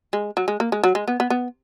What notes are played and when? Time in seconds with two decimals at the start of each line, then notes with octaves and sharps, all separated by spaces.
0.13 G#3
0.37 F#3
0.48 G#3
0.60 A#3
0.72 G#3
0.84 F#3
0.95 G#3
1.08 B3
1.20 B3
1.30 B3